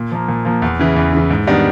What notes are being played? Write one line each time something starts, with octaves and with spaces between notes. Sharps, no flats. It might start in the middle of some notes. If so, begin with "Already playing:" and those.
Already playing: A#2
F3 A#3
A#2
F3 A#3
E2
C#3 E3
E2
C#3 E3
G#2
D#3 G3 B3 D4